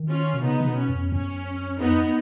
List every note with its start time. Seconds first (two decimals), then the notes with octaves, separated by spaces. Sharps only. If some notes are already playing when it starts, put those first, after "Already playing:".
Already playing: D#3
0.09 C#4 F4
0.34 B2
0.44 C#3 B3 D#4
0.60 C#3
0.67 B2
0.77 C#4
0.89 F2
1.12 F#2 C#4
1.80 F2 B3 D#4